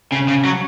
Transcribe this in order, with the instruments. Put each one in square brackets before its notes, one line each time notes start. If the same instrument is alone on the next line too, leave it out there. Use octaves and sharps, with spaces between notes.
[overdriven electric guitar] C#3 [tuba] C#4
[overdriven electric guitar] C#3
F#3